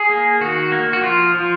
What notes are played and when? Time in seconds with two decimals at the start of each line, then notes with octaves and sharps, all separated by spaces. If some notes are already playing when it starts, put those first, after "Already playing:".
Already playing: G#4
0.09 A#3
0.41 D#3 F#4
0.72 A#3
0.93 F#4
1.03 F3 F4
1.35 F3